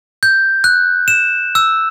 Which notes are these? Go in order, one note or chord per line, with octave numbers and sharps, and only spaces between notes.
G6
F#6
E7
E6